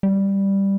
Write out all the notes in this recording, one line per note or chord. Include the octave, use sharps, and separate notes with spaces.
G3